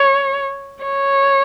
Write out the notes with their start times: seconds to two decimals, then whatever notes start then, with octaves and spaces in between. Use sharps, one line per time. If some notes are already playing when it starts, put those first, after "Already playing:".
Already playing: C#5
0.84 C#5